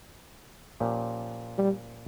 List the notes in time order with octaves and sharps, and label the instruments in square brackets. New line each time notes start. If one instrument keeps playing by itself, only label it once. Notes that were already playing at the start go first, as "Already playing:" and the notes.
[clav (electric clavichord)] A#2 F3 C#4 G4
[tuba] G3